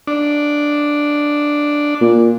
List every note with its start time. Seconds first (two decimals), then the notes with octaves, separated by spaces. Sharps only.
0.07 D4
2.01 A#2